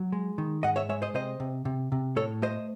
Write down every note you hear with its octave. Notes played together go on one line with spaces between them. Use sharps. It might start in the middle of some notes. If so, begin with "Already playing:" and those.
Already playing: F#3
G#3
D#3
G#2 D#5 F#5
C#5 E5
G#3 C#5 E5
C5 D#5
C3 C5 D#5
C3
C3
C3
A2 A4 C#5
A3 C5 D#5